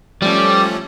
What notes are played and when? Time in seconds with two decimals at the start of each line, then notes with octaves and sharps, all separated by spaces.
0.22 F3 G3 A3 C#4